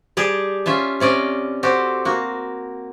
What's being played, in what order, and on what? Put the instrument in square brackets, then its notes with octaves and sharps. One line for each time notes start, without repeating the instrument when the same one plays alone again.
[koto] G3 G4 G#4 A5
C#4 F4 E5 A5
C3 C#4 D5 D#5
C4 F#4 G4 A4
A#3 F#4